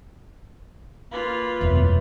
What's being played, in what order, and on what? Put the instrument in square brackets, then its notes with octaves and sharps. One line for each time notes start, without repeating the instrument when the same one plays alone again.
[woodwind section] A#3 [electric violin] F4 B4
[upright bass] E1 F#2 [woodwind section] E3 F#3 A3